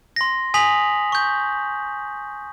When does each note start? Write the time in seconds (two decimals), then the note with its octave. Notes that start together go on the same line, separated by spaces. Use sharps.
0.16 C6 A#6
0.54 G#5 D#6 B6 F7 F#7
1.12 C#6 G6